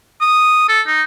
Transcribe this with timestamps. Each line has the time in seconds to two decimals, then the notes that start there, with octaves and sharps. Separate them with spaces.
0.21 D#6
0.69 A4
0.87 D#4